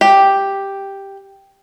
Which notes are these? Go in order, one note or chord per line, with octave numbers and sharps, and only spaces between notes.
G4 G5